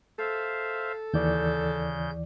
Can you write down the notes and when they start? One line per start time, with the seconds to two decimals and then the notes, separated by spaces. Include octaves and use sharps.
0.19 A4 C5 E5 F5
1.14 D#2 C#3 E3 D5 G6